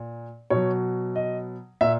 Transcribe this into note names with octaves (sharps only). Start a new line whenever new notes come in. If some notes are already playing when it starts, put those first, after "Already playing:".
Already playing: A#2
B2 F#3 C#5
D#5
A#2 E5